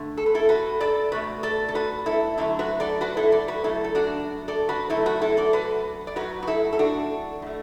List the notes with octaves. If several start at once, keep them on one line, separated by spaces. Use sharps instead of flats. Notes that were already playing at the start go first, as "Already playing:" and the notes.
Already playing: D3 A3
A4
B4
E4 A4
F#4 B4
A4 D5
B2 A3 F#4 B4
A4 D5
A4
F#4 B4
E4 A4
D3 F#3 A3 E4 A4
F#4 B4
A4 D5
F#4 B4
E4 A4
A4 D5
F#4 B4
B2 F#3 A3 E4 A4
A4
D4 F#4
A4 D5
F#4 B4
D3 F#3 A3 E4 A4
F#4 B4
E4 A4
A4 D5
F#4 B4
D5
A2 F#3 A3 F#4 B4
F#4
E4 A4
A4
D4 F#4
A2 A3